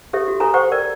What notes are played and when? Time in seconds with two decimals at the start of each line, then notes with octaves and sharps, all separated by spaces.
0.13 G4 A4 C#5 E5
0.28 F#4
0.40 A4 C#5 G#5 A#5
0.54 C5 C#5 F#5 G5 C#6
0.72 A#4 D5 G5